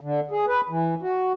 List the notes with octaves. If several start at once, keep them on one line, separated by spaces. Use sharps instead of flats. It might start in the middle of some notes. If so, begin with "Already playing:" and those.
D3
G#4
B4
E3
F#4